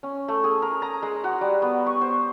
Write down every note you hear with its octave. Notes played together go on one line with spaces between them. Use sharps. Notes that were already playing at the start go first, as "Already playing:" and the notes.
C#4
A3
G#4
A#4
A#5
G#3
F#4
G3
B3
C#6
C5